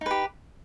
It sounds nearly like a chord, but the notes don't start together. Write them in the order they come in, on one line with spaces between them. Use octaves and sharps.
D#4 B4 G4